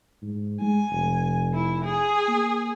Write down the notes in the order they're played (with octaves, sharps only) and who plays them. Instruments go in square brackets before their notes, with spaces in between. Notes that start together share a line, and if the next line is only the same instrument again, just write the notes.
[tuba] G#2
[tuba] G#3 [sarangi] G#5
[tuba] F1
[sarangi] E4
G#4
[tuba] A#3